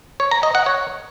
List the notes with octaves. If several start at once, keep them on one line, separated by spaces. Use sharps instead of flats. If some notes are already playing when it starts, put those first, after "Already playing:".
C#5
A#5
D#5
F#5
C#5